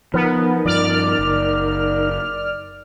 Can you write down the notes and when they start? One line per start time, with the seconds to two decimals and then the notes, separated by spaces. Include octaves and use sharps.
0.14 F3 B3 D#4 A#4
0.66 G2 F3 D5 F6
1.19 F#1